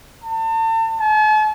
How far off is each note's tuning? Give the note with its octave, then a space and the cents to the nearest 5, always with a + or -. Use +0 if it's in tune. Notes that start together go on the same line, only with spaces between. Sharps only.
A5 +40
A5 -45